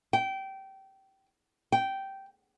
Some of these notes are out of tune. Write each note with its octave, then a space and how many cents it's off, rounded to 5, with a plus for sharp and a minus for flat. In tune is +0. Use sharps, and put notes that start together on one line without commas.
G5 -20
G5 -10